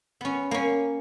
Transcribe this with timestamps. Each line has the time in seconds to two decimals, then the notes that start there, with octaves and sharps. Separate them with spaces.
0.21 B3 C#4
0.51 A#3 C#4